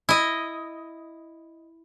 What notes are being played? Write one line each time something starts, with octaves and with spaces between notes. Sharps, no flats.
E4 D#5